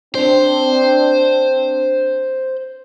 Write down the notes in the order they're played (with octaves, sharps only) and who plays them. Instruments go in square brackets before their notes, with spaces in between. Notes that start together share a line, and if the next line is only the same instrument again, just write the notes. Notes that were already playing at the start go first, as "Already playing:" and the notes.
[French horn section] C4 D4 [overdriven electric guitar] C5